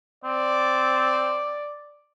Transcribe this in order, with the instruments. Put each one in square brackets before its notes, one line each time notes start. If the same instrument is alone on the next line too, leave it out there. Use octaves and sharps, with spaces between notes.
[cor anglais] C4 [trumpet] D5